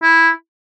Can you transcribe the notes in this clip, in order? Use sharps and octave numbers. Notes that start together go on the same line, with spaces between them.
E4